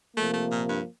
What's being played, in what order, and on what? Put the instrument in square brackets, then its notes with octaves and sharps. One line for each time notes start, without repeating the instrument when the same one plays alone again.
[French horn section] C3 F3 A#3 [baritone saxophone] A3
[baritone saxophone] A3
A#2
G2